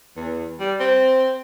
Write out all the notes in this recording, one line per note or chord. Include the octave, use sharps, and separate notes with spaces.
E2
G3
C4